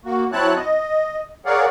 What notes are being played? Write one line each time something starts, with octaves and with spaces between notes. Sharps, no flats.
A#3 F#4
F#3 C4 E4 C#5 A5 F#6
D#5
G#4 A#4 C#5 D5 F5 F#5